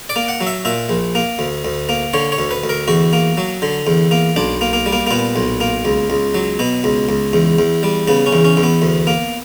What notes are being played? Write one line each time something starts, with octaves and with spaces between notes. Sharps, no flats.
D5
A#3
F#5
F#3
E5
A#2 E5
A#1
A#3
D2
D2
A#3
D3 C#5
C#5
D2
B4
D2
A#4
E2 F#4
A#3
F#3
D3
E2
A#3
B1 D4
A#3
A#3
G3
A#3
A#3
A#2 B3
B1
A#3
C#2
C#2
F#3
B2 B3
C#2
C#2
E2
E2
G3
C#3 B3
C#4
E2
C#4
E2
B3
D2
A#3